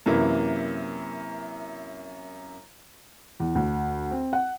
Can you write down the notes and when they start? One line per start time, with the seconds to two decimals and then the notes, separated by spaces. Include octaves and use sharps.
0.06 F#2 C3 E3 A#3 E4
3.40 E2
3.55 D2
4.11 C4
4.33 F#5